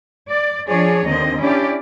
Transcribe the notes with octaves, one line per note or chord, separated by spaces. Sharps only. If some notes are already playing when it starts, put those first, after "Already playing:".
D5
F3 D4 G#4 C#5 D5
D#2 D3 C4 D#5
C#4 D4 E4 G4 D5